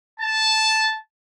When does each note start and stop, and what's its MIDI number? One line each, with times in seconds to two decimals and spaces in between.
0.19 0.95 81